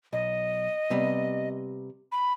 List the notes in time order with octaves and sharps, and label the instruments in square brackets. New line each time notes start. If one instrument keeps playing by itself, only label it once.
[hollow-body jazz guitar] B1 [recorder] D#5
[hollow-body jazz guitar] C3 G3 B3
[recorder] B5